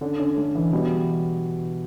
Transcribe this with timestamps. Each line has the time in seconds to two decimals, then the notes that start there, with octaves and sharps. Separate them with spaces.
0.01 D3 C#4
0.20 C#4
0.37 A3
0.55 E3
0.72 B2 G3